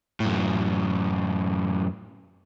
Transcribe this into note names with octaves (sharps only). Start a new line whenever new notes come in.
F#2 A2